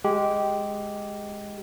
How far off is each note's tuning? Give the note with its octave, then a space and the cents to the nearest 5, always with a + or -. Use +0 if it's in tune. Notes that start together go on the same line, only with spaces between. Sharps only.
G#3 +0 G4 -10